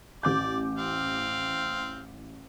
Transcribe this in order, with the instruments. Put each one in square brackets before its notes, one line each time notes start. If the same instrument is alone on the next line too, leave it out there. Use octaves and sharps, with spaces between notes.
[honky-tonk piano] A1 D6 G6 [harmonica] D5
[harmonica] C4 F5